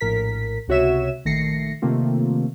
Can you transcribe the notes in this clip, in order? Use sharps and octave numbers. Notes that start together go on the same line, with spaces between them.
A#1 A2 A#4 B6
C#2 C3 F#4 C#5 E5 E7
A#1 D#3 A3 A#6 C7 C#7
C3 D#3 A3 A#3 C4 F4